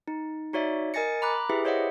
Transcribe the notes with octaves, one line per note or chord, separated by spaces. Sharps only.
D#4
D#4 F#4 C#5 D5 E5
A#4 D#5 G#5 A6 A#6 C#7
A#5 B5 D6 F#6
E4 G4 G#4 B4 E5
C5 C#5 D#5 E5 F#5